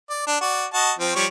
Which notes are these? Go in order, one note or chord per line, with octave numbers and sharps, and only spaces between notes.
D5
D4
F#4 D5
F#4 D#5 A5
F3 C4
F3 G3 C#5